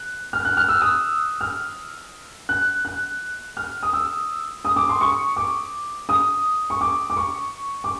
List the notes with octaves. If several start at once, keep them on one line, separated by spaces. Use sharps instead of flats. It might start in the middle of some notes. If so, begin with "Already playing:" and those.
Already playing: F#6
F6
F#6
F6
E6
D#6
F6
F#6
F#6
F6
D#6
E6
D#6
D6
C6
C#6
D6
D#6
C#6
D6
D6
C#6
D6